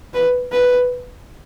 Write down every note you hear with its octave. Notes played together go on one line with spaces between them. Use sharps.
B4
B4